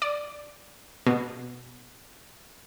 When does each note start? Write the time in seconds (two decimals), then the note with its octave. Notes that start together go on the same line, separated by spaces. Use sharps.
0.02 D5
1.07 B2